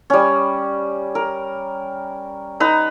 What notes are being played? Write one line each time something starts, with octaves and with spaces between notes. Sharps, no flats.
G3 C#4
A#4
D#4 B4 A#5